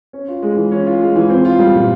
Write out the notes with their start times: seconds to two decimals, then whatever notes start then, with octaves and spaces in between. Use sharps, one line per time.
0.13 C#4
0.28 F4
0.42 G#3
0.57 E3
0.72 C#4
0.86 F4
1.01 G#3
1.16 E3
1.30 C4
1.45 F4
1.59 G3
1.75 A#2